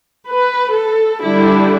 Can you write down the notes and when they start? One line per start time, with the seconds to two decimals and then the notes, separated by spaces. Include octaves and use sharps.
0.29 B4
0.76 A4
1.23 D3 G3 D4 E4